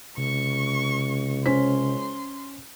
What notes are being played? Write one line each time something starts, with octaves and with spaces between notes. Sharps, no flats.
C#2 C3 C#6
C#4 C5 C6 B6